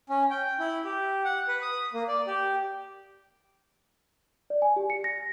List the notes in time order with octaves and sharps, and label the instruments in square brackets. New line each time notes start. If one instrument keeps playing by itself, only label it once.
[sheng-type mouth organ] C#4
G5
E4
G4
F#5
B4
D#6
A#3
D5
G4
[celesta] D5
G#5
G4
C#7
A#6